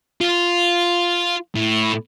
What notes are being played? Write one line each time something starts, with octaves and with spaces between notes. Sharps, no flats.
F4
A2